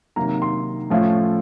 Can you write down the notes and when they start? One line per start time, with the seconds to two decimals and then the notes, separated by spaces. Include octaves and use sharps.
0.16 C3 D#3 F#3 A#3 A#5
0.42 C6
0.90 A2 F3 A3 C#4 F4